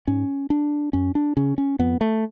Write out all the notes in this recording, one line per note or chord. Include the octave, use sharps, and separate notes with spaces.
G#2 C#4
D4
F#2 C#4
D4
C#3 C#4
C#4
F2 B3
A3